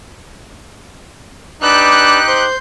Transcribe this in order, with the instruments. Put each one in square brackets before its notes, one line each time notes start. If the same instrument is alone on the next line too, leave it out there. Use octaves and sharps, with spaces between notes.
[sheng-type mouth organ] D4 B4 E6 [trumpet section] D#4 G4 [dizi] D6 [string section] F#6
[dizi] C5 [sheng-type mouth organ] C6 G6